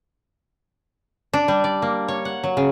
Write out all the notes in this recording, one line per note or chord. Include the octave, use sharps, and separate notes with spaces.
D4
G3
D5
A#3
C#5
F#5
F#3
C#3